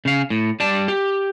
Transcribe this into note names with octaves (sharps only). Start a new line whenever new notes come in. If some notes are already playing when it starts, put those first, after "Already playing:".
C#3 F5
A2
G3 D5 A5
G4